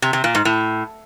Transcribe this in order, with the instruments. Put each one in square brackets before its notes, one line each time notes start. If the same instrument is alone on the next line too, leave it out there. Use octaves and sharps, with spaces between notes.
[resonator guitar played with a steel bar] C3
C3
A#2
G#2
A2